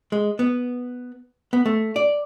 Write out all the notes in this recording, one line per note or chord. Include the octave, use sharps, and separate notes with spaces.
G#3
B3
B3
A3
D5